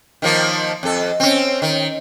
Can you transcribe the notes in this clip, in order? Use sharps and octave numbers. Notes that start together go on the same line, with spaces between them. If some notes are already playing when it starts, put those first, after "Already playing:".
D#3 F3 A#3
F2 A4
C4 C#4
D#3